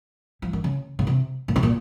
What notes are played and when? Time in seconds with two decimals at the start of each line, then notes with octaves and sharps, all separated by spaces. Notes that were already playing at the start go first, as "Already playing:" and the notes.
0.42 F3
0.53 D#3
0.64 C#3
0.99 C#3
1.07 C3
1.48 A#2
1.56 C3
1.63 A#2